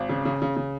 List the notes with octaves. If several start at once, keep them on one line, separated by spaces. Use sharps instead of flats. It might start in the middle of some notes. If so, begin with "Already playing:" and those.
Already playing: G#1
C#3
C#3
C#3
C#3